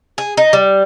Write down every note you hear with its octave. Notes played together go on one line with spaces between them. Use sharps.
G#4
D#4
G3